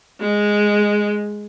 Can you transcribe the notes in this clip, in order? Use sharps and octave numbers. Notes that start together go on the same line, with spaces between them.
G#3